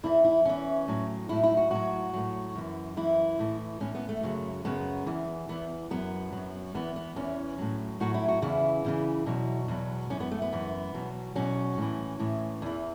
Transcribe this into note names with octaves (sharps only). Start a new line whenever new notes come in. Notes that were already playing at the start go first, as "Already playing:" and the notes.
E2 E3 E4
E4
E2 E3 C#4
A2 F#3
A2 F#3 E4
E4
F#4
A2 F#3 F#4
A2 F#3
F#2 E3
F#2 E3 E4
A2 E3
A2 E3 C#4
B3
A3
F#2 C#3 F#3
F#2 C#3 F#3 B3
E2 E3
E2 E3 B3
F#2 F#3 B3
F#2 F#3
E2 E3 B3
B3
E2 E3 C#4
A2 F#3
A2 F#3 F#4
E4
F#4
E2 C#3 E3 E4
E2 C#3 E3
E2 B2 F#3
E2 B2 F#3
F#2 E3 C#4
B3
A3
B3
F#2 E3
E2 B2 F#3
E2 B2 F#3 C#4
A2 E3
A2 E3
E2 E3